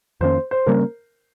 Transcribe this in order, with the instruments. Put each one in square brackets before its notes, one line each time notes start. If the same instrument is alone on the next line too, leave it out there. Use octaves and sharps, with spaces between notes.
[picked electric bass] F2 D#3 A#3 C#4 [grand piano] C5
[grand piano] C5
[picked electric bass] C#3 G3 A#3 C#4 [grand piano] A#4